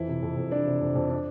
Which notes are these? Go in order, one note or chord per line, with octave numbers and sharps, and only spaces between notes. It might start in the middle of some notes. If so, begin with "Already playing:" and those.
Already playing: F2 E3 E4
C3
F2
F2
E3 D4 D5
C3
F2
F2
D4